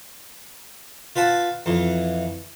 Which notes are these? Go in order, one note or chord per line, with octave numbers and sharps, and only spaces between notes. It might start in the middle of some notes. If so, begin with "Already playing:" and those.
F4 B4 F#5 A5
F2 E3